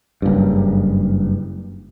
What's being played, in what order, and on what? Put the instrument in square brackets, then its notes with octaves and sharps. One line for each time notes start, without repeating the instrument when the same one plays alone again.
[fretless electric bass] F#1 G2